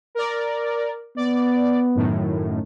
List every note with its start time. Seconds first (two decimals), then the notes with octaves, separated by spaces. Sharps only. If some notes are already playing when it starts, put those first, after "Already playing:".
0.15 A#4 D5
1.17 B3 D5
1.95 F#2 A2 D#3